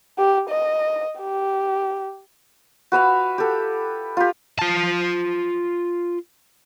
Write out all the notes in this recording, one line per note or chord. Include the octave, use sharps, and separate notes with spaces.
G4
D#5
G4
F#4 B4 E5 F5
G4 A4
F4 G4
F4 A5